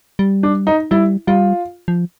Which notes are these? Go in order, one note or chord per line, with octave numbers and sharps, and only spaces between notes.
G3
D4
D#4
G3 E4
G3 F4
F3